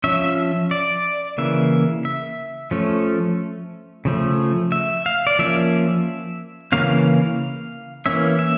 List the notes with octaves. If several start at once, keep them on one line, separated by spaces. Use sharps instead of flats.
F3 C#4 E5
D5
C#3 E3 A#3 E5
E5
F3 A3 C#4
C#3 F3 A3
E5
F5
D5
F3 A#3 C#4 E5
C#3 E3 G3 A#3 C#4 F5
E3 A#3 C#4 E5
E5